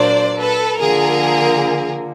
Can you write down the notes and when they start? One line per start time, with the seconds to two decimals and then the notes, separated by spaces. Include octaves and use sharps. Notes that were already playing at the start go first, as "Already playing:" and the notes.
Already playing: A#2 F#3 A#3 D4 C5 D5
0.38 A4 B4
0.79 D3 F3 A#3 G#4 A#4